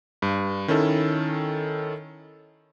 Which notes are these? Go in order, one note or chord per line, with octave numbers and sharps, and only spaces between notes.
G2
D#3 C#4 E4 A4